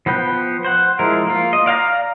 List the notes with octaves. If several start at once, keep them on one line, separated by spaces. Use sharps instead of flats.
F3 B3 B4 G5
C5 F#5
F3 G#3 E4 A#4
A#3 F4
D#5
D5 F5 G5 A#5